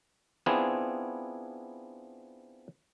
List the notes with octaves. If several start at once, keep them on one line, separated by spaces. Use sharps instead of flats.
B3 C4 D4 E4 F4 G#4